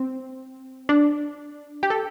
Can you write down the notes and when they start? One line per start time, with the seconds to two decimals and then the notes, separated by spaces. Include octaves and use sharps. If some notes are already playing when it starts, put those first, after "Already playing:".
Already playing: C4
0.89 D4
1.83 G4
1.90 A4